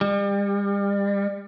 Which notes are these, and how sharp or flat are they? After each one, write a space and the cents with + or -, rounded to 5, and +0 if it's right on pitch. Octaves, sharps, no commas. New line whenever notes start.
G3 +35